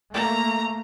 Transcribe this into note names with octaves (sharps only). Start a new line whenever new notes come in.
A3 A#3 A#5